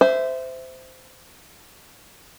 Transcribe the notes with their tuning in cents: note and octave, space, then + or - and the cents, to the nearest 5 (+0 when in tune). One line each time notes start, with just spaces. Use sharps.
C5 -20 E5 +0